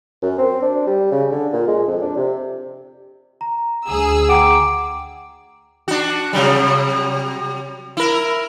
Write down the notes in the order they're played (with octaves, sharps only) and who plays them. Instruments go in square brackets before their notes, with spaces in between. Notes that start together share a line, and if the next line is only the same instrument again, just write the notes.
[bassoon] F#2
C4
D4
G3
C#3
D3
A#2
G#3
F2
D4
C3
[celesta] A#5
[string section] D2 G#4 E6
[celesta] F#5 G5 A#5 [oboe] D6
[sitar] D4 F#4
C3 F#3 G3
E4 A#4